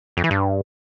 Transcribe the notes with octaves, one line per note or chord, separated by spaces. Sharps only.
F2
E3
G2